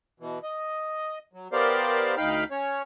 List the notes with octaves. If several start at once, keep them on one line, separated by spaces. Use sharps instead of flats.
B2 E3
D#5
F#3
B3 G4 A#4 C5 D5 F5
D2 D#4 F5 G5 B5 F6
C#4 C#5